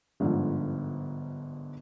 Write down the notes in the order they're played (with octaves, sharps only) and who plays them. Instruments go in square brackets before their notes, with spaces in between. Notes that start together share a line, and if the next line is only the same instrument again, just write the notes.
[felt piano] G1 G#2 D3 F3